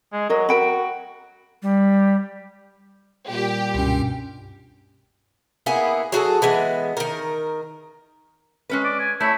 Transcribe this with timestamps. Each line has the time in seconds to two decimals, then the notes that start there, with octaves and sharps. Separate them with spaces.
0.13 G#3
0.29 F#3 A#4 D#5
0.49 F#4 A#4 G5 B5
1.63 G3
3.29 A#2 G3 G4
3.74 C#2 G2 B2 C#4
5.66 A#3 B3 E4 G#4
6.12 F#3 F#4 G#4 A4
6.42 E3 G#3 B3
6.97 D#3 A#4
8.69 G#3 C#4 B4
8.84 D5
9.00 G#5
9.20 A3 E4 C#5